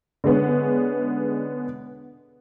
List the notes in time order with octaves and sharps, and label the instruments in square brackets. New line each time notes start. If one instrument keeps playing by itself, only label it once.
[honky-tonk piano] D3 G#3 B3 C#4